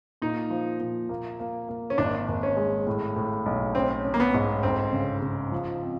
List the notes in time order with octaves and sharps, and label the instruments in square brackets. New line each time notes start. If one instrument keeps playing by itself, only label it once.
[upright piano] A#2 [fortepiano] D#4
[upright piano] F3
A#2
A#3
A#3
A#3
[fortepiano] C#4
[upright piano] G#1 [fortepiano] D4
[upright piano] G#1
[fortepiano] C#4
[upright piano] G#3
A2
A2
B1
[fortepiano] C4 [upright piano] C#4
[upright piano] C#4
[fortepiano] A#3
B3
[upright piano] G#2
[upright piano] G1 [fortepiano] C4
[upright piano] C#3
C#3
F3
C4